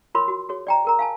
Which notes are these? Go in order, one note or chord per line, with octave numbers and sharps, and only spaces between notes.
F4 A#4 C#5 B5 C6
F#4
F#4 G#4 C#5
D5 G5 A#5
G#4 A#4 A#5
F5 G#5 A5